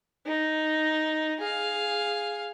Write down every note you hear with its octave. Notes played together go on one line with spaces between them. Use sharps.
D#4
G#4 F5